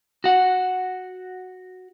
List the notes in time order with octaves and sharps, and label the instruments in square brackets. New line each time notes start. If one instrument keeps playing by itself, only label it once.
[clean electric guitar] F#4 F#5